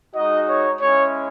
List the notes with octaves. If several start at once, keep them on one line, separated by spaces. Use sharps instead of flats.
G#3 D#4 F#4 D#5
C#5
G#3 C#4 E4 C#5